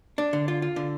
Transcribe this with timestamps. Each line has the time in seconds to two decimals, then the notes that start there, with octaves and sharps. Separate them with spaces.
0.18 D4
0.33 D3
0.48 F4
0.62 F4
0.76 D3